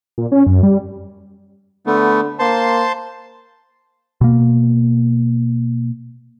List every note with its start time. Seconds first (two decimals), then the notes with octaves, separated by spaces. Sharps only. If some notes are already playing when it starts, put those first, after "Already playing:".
0.18 A#2
0.32 C#4
0.47 F#2
0.63 G3
1.87 D3 A3 B3
2.39 A#3 C5 A5 C6
4.21 B2 A#3